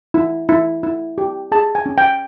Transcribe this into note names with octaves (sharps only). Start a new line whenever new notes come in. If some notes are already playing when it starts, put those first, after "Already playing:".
E4
E4
E4
G4
G#4 A5
G#5
C#4
G5